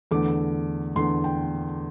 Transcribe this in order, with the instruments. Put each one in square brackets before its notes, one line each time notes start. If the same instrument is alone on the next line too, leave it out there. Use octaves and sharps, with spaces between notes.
[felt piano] E2 D3 A3 D6
E2 D3 A3 C6
G5